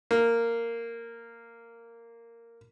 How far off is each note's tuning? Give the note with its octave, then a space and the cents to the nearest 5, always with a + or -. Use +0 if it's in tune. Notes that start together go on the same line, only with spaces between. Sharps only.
A#3 -10